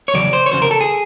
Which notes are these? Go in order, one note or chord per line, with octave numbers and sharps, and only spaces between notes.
C#5
E2 C#3 F#3 D5
C5
C#5
E2 C#3 F#3 C5
A#4
A4
G#4